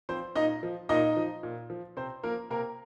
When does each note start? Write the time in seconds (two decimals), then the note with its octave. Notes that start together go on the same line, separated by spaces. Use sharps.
0.09 F3 C4 C5
0.35 A#2 D#4 D#5
0.63 F3
0.89 A#2 D#4 D#5
1.16 F3
1.43 A#2
1.70 F3
1.97 C3 C4 C5
2.23 F3 A#3 A#4
2.50 C3 A#3 A#4